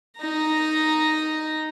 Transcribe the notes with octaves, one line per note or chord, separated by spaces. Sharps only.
D#4 A#5